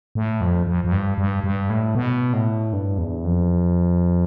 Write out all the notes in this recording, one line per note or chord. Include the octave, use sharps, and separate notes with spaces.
A2
F2
F2
F2
G2
G2
G2
A2
B2
A2
G2
E2
F2